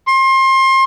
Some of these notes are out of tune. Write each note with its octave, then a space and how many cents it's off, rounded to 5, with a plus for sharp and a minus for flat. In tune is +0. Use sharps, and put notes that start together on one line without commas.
C6 +30